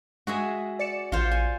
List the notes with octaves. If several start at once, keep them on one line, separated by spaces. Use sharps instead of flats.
G#3 F#4 G#4 E5
D5 C#7 E7
A1 F4 C5
G#5